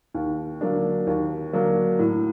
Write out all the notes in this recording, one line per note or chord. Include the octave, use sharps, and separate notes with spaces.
D#2
D3 F#3 A#3 D4
D#2
D3 F#3 A#3 D4
A2